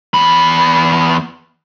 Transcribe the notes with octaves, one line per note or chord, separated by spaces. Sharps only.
E2 B5